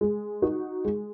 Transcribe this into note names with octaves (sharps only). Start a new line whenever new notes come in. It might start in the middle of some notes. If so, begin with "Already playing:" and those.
G#3
D#4 F#4
G#3